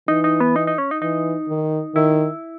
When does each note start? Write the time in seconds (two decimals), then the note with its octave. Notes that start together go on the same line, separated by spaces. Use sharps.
0.08 E3 D#4
0.24 D#4
0.40 B3
0.56 D#4
0.67 D#4
0.78 C#4
0.91 D#4
1.02 E3 D#4
1.49 D#3
1.95 D#3 E4